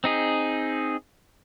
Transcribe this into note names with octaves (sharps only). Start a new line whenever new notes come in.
C4 D#4 G#4